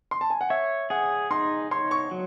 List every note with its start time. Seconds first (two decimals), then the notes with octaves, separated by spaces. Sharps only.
0.11 C6
0.21 A5
0.30 G#5
0.41 F#5
0.50 C#5 E5
0.90 G#4 F#5
1.31 D#4 C6
1.71 C#5 C6
1.91 C#6
2.11 F#3